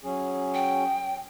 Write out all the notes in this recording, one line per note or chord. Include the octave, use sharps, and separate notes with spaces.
F#3 C#4 G#4
G5